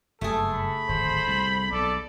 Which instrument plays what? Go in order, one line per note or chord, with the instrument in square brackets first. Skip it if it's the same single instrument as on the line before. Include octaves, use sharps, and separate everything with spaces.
[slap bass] F#1 G2 [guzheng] A3 G#4 [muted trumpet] A4
[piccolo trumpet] B5
[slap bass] D1 G#1 [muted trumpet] C5
[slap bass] C2
[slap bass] B1 [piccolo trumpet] A4 [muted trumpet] D5